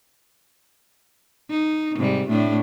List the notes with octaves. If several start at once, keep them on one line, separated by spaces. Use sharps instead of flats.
D#4
G#2 C3 G3
A2 A3 D4